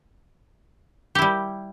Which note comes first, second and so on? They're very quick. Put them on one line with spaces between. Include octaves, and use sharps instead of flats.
G4 E4 G3